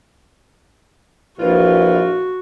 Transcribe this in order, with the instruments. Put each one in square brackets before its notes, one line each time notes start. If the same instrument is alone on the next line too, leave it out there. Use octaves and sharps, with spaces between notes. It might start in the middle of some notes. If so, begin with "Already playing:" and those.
[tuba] A#1 [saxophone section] E3 F4 [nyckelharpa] F#4